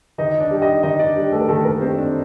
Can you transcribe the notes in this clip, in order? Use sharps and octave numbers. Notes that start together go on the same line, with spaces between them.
D#3 D#4 D#5
D4 D5
G3 D4
D#4 D#5
D#3 D#4 D#5
D4 D5
G3 D4
A3 A4
A#4
D#3 A3 A4
A#3 A#4
G3 C4 D4 C5
D4 D5